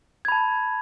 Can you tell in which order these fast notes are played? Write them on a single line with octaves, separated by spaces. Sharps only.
G#6 B5 A5